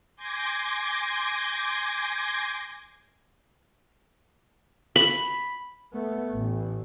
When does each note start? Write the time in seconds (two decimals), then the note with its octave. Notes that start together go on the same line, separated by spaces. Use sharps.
0.16 G#5 C6 D6 G6 G#6 A#6
4.96 B5
5.93 A3 B3
6.34 A1